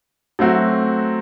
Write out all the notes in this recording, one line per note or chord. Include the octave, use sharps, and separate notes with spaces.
F#3 A3 C4 F#4